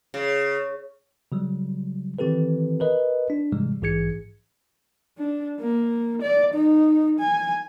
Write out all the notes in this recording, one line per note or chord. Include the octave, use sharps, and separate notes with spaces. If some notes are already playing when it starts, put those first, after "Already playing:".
C#3
C#3 F#3 G3
D#3 E3 C4 G4 A4 B4
A#4 B4 D#5
D4
G#2 C3 E3 G3 G#3
A#1 G#2 E3 G#4 G#6 C#7
D4
A#3
D5
D#4
G#5